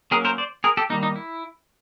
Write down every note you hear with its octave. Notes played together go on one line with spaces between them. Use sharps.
F#3 A#3 C#4 G#4 A#4
A#4 C5
C5 D5
G#4 A#4
G4 A4
D#3 G3 A#3 D#4
D#4
E4